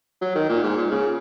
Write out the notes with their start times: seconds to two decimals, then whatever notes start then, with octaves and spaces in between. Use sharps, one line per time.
0.21 F#3
0.35 D#3
0.49 A#2
0.63 G#2
0.78 A#2
0.91 C#3